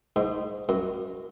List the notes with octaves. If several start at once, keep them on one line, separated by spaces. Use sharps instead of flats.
G#2
F#2